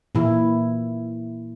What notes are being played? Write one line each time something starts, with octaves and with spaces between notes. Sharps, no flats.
A#2 E3 E4